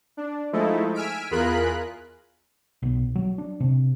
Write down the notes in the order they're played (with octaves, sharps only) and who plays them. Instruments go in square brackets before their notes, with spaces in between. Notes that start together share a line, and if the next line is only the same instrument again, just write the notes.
[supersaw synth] D4
F3 G#3 A3 D#4 E4 A4
G#5 E6 F6 B6 D7
E2 F4 G#4 A#4 B5 F#6
[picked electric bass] B1
F#3
D4
C3